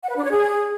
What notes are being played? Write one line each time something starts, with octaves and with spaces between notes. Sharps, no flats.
F#5
B4
D4
C#5
G#4